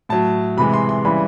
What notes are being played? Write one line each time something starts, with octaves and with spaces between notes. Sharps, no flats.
A2 F#3 A5
C3 E3 G#3 B5
C6
C6
C#3 E3 G3 B5